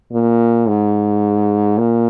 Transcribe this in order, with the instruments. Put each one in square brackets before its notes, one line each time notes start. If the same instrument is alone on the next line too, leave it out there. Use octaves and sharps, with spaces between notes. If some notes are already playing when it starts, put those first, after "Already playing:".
[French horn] A#2
G#2
A#2